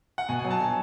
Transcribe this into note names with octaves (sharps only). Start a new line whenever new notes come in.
F#5
B2 G#5
G#5
F#3
A5
F#3 G#5